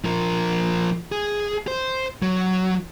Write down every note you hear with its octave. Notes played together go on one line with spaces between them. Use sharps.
F3 A#4
G#4
C5
F#3